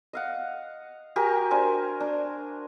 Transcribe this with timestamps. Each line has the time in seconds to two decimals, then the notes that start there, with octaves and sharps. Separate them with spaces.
0.13 D#5 F5 F#5
1.16 F#4 G4 A#4 G#5
1.51 D4 A#4 C5 G#5
2.00 D4